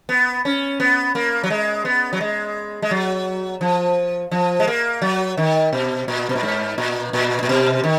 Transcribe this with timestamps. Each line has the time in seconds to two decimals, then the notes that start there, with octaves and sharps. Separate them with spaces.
0.09 B3
0.45 C#4
0.80 B3
1.15 A#3
1.43 F#3
1.50 G#3
1.85 B3
2.13 F#3
2.21 G#3
2.82 G#3
2.91 F#3
3.61 F3
4.31 F3
4.60 G#3
4.67 A#3
5.02 F#3
5.37 D#3
5.73 B2
6.08 A#2
6.29 B2
6.36 A#2
6.43 G#2
6.78 A#2
7.13 A#2
7.43 A#2
7.49 B2
7.84 D#3